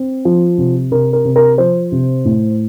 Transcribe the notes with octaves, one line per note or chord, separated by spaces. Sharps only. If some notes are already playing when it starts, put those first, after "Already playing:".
Already playing: C4
F3
C3
C3 A#4
A#4
C3
A#4
F3 C5
C3
A2